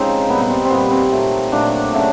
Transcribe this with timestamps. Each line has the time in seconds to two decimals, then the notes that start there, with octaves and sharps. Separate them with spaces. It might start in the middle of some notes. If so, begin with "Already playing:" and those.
Already playing: C#3 F3 G#3 C4 D#4
0.30 A#2 G3 B3
0.41 B3
0.50 C4
0.65 C4
0.70 A#2 G3 B3
0.91 C4
1.11 A#2 F#3 A3
1.52 A#2 F#3 A3 D4
1.94 C#3 F#3 A3